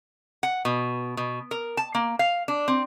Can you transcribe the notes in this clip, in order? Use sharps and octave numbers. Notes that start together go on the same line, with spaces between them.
F#5
B2
B2
A#4
A5
A#3
F5
D4
C4